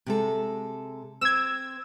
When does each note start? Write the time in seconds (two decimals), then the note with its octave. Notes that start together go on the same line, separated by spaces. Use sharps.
0.06 C3 G#3 A4
1.21 C4 E6 G#6